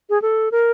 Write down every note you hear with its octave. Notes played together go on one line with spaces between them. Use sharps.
G#4
A4
A#4